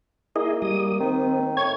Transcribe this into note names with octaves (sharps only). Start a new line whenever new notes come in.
A#3 E4 G#4 D#5
G3 D#6
D#3 C4
A2 C#5 G#6